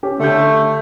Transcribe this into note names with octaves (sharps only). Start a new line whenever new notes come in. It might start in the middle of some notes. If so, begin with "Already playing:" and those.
C#4 G4
D3 A3 G6